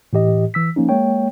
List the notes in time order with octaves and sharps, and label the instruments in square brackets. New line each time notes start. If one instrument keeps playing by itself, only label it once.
[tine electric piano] A2 E3 G4 D#5
E3 E6 B6
F3 A#3 C#4 D#4
G#3 A#3 C#5 G5